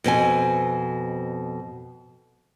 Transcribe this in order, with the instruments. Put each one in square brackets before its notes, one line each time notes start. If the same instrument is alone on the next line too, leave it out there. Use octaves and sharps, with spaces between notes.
[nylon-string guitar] F2 B2 C4 G#5